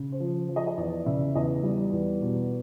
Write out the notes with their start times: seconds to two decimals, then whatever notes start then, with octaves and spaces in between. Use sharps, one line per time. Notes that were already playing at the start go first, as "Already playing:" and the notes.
Already playing: C#3
0.12 C5
0.20 F3
0.49 F3
0.56 D#5
0.67 D#5
0.77 E2 D5
1.06 C#3 E5
1.35 E2 D#5
1.64 G3 D5
1.92 E2
2.21 B2